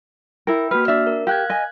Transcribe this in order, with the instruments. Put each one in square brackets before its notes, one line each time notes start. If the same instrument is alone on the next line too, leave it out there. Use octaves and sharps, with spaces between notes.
[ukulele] E4 A#4 [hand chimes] G5 B5
[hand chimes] A#3 F#4 F6 [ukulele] B4
[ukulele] D4 E5
[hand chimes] A#4
[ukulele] G4 [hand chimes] F5 F#6 G#6
[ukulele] D#5 G#5